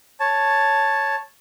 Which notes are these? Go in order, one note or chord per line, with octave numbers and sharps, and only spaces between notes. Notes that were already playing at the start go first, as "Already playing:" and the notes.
C#5 A5